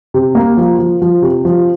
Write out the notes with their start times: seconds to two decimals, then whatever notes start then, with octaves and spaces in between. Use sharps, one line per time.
0.14 C3
0.35 A#3
0.57 F3
0.79 F3
1.02 F3
1.22 C3
1.45 F3